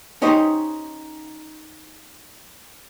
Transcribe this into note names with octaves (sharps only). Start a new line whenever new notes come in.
C#4 D#4 G4 C5 D#5